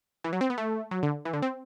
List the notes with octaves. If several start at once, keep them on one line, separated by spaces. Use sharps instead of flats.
E3
F#3
C4
B3
A3
F#3
D3
E3
D3
C4